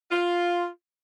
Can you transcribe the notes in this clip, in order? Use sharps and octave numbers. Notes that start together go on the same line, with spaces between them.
F4